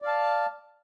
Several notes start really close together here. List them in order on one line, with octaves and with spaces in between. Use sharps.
D5 F5 A5